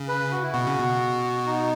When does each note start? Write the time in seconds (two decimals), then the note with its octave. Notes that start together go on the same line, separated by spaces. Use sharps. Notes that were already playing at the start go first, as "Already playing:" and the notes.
Already playing: C#3
0.08 B4
0.32 F#4
0.42 E4
0.53 B2 F#4
0.67 C#3
0.79 B2
1.47 D#4